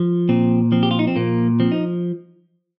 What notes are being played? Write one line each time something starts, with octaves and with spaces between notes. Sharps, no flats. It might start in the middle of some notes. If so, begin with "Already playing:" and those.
Already playing: F3
A#2 C4
F3 C4
G4
F4
D#4
C4
A#2 A#3
F3 C4
D#4